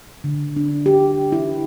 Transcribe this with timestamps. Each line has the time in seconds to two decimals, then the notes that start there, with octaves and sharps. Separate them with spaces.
0.24 D3
0.56 D4
0.86 G4
1.32 E4